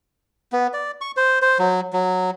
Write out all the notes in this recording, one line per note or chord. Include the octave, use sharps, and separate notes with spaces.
B3
D5
C#6
C5
C5
F#3
F#3